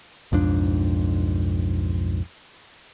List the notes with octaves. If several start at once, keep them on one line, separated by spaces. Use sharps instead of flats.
B1 F2 G#2 D4